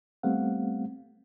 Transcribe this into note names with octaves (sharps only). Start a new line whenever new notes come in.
G3 A3 B3 C4 F5 F#5